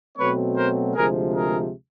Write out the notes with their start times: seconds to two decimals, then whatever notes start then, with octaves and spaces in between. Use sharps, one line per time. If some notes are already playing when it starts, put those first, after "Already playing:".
0.18 B2 F#3 A3 C4 B4 C#5
0.56 A#4 C5
0.95 D2 C3 F3 G#3 G#4 A#4
1.34 G#4 A#4